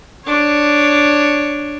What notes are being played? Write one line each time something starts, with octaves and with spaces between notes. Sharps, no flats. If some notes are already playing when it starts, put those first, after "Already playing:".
D4 C#5